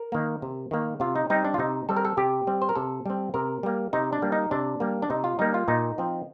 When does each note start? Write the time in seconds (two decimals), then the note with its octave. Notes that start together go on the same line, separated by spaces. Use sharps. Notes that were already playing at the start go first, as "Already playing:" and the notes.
Already playing: A#4
0.12 D#3 A#3
0.42 C3
0.71 D#3 A#3
1.00 C3 F4
1.16 D#4
1.30 G3 C4 D#4
1.45 D4
1.54 F4
1.58 C3 D#4
1.89 G3 C4 A4
1.97 A#4
2.05 A4
2.17 C3 G4
2.47 G3 C4
2.62 C5
2.69 A#4
2.76 C3 A4
3.06 G3 C4
3.34 C3 A#4
3.63 G3 A#3
3.93 C3 D#4
4.13 D4
4.22 G3 A#3
4.32 D#4
4.51 C3 D4
4.80 G3 A#3
5.02 D4
5.10 C3 D#4
5.24 F4
5.39 G3 A#3 D#4
5.54 F4
5.68 A#2 D#4
5.98 F3 C4